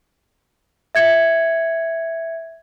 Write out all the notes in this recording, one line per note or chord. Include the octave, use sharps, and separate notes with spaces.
E5 G#6 C#7